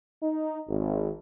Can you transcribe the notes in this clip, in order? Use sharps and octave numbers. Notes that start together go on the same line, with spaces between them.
D#4
G#1